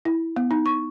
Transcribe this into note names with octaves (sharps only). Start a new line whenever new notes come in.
E4
B3
D#4
C#6